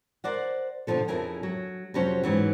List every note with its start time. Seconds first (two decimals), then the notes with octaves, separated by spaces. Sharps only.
0.24 A#4 C5 D5 F#5
0.87 B2 D3 E3 F3 A4
1.08 F2 C#3 E4 A#4 G#5
1.43 F#3
1.94 F2 C3 F#3 C#4 C5
2.23 G#2 E3 F#3